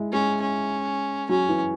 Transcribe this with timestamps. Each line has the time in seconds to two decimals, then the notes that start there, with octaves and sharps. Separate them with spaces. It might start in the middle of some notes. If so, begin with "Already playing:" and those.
Already playing: G#3 E4
0.12 G#3 C#4
0.41 C#4
1.29 F#3 C#4
1.49 E3